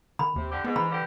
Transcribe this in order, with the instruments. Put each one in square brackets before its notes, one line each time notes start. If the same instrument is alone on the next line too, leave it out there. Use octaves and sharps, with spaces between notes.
[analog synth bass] D#3 [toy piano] B5
[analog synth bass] D#2 [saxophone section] C3
[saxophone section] D3 G4
[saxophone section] G#2 [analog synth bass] B3
[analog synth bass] E3 [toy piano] B5
[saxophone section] G2 D3 G4